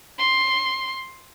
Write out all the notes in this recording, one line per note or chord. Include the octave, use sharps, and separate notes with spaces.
C6